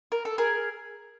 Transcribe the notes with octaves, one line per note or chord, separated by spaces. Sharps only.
A#4
A4
G#4 A#4